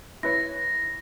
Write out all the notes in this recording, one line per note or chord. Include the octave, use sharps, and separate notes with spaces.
E4 B4 C#5 A#6